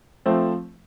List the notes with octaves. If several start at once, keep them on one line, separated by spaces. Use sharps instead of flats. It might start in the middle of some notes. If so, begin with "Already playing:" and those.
F3 A3 C4